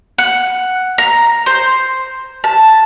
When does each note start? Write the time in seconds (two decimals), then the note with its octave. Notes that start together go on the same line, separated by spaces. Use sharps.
0.18 F#5
0.98 A#5
1.46 C5
2.44 A5